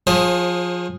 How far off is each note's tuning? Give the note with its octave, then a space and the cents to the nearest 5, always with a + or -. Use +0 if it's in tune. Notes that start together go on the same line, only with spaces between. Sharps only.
F3 +20 G#4 +0 C5 +45